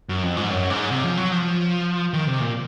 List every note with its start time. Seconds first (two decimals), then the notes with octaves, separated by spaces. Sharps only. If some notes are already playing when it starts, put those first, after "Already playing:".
0.09 F#2
0.23 F2
0.37 G#2
0.50 F#2
0.70 G#2
0.90 C3
1.04 F3
1.18 F#3
1.32 F3
2.13 D#3
2.27 C3
2.40 A#2